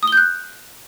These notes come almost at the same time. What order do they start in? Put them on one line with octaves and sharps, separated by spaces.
D#6 G7 G6 F#6